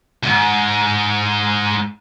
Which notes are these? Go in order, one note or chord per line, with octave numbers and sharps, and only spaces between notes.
C#2 G#2